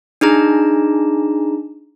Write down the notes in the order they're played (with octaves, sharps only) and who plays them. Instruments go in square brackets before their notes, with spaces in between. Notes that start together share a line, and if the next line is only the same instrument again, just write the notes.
[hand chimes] D4 D#4 G#4 A#5